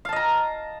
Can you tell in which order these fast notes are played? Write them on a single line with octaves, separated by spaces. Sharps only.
F5 A5 D#5 A#5